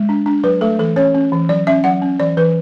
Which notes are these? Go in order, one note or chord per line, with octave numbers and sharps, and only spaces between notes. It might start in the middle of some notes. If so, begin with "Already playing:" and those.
Already playing: G#3
D4
D4
F#3 B4
A3 A4
E3 A4
C#4 C#5
C#4
E3
F#3 D5
C#4 E5
F#3 F#5
C#4
E3 D5
E3 B4